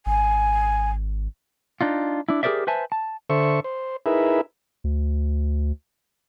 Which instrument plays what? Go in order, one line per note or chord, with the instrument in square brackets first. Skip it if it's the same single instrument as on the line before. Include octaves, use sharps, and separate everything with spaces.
[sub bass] G#1 [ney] G#5
[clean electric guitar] D4 D#4 F4
D4 E4
G4 G#4 A#4 C5 D5 E5
B4 C5 E5 G#5 A5
A5
[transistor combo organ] D3 A4 C5 E5 C#6
C5
D#4 E4 G#4 A#4 B4 E5
[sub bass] D2